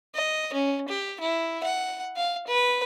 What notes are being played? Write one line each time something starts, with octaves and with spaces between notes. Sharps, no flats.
D#5
C#4
G4
E4
F#5
F5
B4